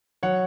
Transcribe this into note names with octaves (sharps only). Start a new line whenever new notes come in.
F#3 C#5 F#5